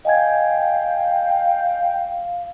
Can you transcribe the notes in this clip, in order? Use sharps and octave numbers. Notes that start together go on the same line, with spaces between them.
D#5 F5 G5 G#5 G#6